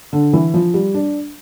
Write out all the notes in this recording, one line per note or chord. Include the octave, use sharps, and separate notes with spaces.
D3
E3
F3
G3
D4